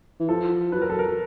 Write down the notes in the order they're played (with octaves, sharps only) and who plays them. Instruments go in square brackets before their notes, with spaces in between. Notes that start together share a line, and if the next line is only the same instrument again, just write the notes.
[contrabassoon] E3
[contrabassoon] F3 [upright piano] A4
[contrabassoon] F#3 [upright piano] B4
[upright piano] A#4
A4
A#4
[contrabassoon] F#3